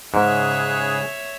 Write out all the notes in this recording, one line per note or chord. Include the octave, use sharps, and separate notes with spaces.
G#2 C#3 G#4 C#5 E5 F#6